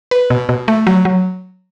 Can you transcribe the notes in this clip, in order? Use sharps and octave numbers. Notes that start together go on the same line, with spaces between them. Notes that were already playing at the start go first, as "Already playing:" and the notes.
B4
B2
B2
A3
F#3
F#3